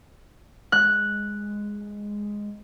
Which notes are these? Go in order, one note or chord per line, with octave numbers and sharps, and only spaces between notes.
G#3 F#6